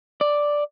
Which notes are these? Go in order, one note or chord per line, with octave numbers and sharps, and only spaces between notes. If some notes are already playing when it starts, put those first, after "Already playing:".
D5